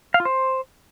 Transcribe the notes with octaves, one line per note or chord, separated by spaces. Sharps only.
F5
F4
C5